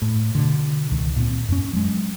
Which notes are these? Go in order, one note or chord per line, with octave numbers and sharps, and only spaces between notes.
A2
B2 D3
C#2 D#3
A#2 C4
F#2 C#4
F#3 G#3